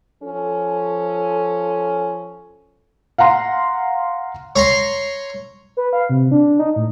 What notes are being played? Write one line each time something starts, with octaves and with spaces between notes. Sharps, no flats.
F3 C#4 A4
F5 F#5 A#5 C6
C#5 A#5 C6
B4
F5
C3
D4
D#4
A2